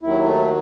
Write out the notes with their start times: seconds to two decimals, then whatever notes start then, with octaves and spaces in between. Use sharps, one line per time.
0.02 D#2 D#3 F#3 E4
0.25 A3